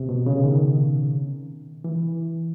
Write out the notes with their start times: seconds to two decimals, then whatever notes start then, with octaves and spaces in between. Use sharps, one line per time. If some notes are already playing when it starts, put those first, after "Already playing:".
Already playing: C3
0.09 B2
0.26 C#3
0.44 D#3
1.84 E3